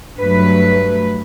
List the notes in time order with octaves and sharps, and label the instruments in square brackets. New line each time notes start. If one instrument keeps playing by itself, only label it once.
[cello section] G2 F#3 A3 B4